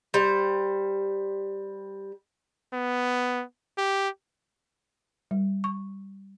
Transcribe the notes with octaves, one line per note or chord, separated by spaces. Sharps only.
G3 C5
B3
G4
G3
C#6